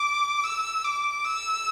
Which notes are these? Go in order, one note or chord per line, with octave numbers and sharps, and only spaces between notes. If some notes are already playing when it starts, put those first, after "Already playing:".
Already playing: D6
E6
D6
E6